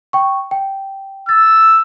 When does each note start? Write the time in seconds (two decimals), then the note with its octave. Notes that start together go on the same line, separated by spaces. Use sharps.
0.13 G5 C#6
0.51 G5
1.29 E6 A6